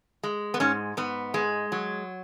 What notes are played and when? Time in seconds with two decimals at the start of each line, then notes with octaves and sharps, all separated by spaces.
0.23 G#3
0.54 B3
0.60 G#2 C#4
0.97 G#2 B3
1.34 G#3
1.72 F#3